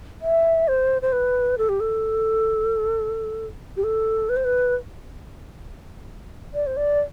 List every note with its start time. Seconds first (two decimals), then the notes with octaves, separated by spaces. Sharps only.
0.22 E5
0.68 C5
1.02 C5
1.12 B4
1.58 A4
1.69 G4
1.80 A4
3.77 G4
3.84 A4
4.29 B4
4.36 C5
4.45 B4
6.54 D5
6.67 C5
6.77 D5